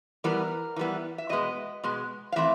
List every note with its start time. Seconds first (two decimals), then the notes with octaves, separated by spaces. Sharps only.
0.24 E3 G3 B3 A#4
0.76 E3 G3 B3
1.18 E5
1.29 B2 G#3 B3 D#5
1.84 B2 G#3 B3
2.32 F5
2.36 E3 A3 C4 E5